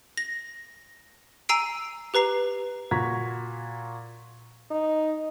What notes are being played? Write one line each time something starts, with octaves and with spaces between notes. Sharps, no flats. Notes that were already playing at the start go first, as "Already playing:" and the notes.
A#6
G#5 A#5 E6 C7 D7
G4 B4 A#5 C7
A#2 F#4 A#5 G#6 B6
D#4